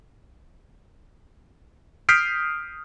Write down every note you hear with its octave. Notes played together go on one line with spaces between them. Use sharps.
D#6 F6 G6 B6 C7 D7